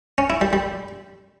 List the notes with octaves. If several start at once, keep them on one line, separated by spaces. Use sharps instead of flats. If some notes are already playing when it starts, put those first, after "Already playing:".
C#4
E4
G3
G3